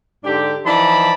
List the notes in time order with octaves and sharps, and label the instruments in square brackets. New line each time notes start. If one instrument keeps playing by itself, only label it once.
[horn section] G#2 D3 D4 G4
E3 F3 D#4 D5 A5 B5